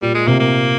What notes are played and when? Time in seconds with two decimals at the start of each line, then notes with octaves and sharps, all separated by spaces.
0.02 A#2 G3
0.15 G#3
0.27 C3 A#3
0.40 A#3